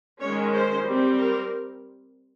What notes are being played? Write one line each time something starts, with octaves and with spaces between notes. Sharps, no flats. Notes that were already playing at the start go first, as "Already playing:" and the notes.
D#3 G#3 C#4 C#5
C5
G3 C4
A#4